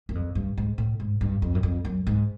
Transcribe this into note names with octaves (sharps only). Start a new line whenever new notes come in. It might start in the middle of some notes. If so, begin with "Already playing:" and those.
F#2
F2
G2
G#2
A2
G#2
G2
F2
F#2
F2
F#2
G#2